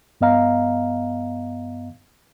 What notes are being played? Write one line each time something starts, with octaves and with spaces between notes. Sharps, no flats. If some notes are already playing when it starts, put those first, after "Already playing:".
G2 B3 D#5 F5 A#5